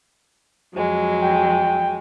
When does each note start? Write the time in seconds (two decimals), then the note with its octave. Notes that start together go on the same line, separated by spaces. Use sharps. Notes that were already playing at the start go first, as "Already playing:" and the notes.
0.74 F2 F#3 G#3
1.22 G5